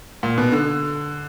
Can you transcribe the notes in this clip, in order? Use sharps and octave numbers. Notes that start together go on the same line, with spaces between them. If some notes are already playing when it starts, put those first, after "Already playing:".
A#2
B2
D3